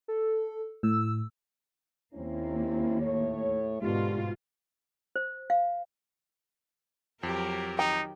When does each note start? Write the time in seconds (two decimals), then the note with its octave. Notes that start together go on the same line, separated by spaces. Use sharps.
0.08 A4
0.83 A2 E6
2.14 D#2 A#3 C4 C#4 E4
3.02 A2 A3 C#5
3.82 G#2 B2 D3 D4 F4 G4
5.16 C5
5.50 F5
7.23 F2 F#3 G4 A#4
7.79 D#3 D#4 G5 A#5